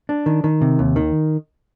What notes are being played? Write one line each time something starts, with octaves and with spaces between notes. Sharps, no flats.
D4
D#3
D#3
C3
D#2
D#3